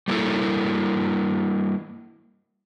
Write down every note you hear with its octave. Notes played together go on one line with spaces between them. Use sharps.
G3 A#3 E4 A4